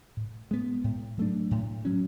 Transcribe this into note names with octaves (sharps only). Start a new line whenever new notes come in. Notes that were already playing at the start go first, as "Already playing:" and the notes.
A2
G#3 B3
A2
F#3 A3 D4
A2
F#3 C#4